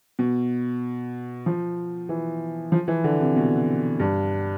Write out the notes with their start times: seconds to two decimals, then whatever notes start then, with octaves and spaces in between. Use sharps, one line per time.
0.19 B2
1.46 F3
2.09 E3
2.72 F3
2.88 E3
3.04 D3
3.21 C3
3.36 B2
4.00 G2